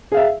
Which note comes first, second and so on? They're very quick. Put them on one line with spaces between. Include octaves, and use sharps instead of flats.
G#4 F5 E5